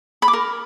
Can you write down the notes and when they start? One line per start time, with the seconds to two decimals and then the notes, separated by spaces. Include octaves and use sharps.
0.22 B5
0.28 D6
0.33 A#4